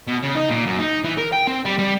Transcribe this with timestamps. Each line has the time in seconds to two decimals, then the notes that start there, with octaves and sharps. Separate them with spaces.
0.08 B2
0.23 C#3
0.36 D#4
0.50 A#2
0.66 F#2
0.80 D#4
1.05 E3
1.18 A#4
1.33 G5
1.47 C4
1.65 G3
1.79 G3